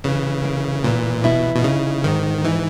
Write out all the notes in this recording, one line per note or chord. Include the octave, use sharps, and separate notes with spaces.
C#3 E3
A#3
A#2 E3
B2 E4
B2
C#3 D#4
G#2 D#3
E3 D#4